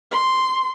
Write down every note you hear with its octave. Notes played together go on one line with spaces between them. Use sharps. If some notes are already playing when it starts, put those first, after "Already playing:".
C6